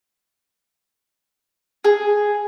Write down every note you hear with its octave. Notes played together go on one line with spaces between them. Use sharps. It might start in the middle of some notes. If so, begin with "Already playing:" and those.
G#4